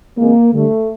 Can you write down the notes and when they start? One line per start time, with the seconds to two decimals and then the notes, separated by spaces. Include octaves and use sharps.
0.18 C3 E3 G#3 A#3
0.53 D3 G3 A3